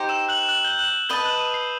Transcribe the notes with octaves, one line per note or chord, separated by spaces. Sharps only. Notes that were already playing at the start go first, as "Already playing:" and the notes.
Already playing: D#4 G4 C5
E6 E7
F#6 F#7
F#6 F#7
G6 G7
F#6 F#7
B4 D#5 A5 G6 G7
F#6 F#7
D#6 D#7
C7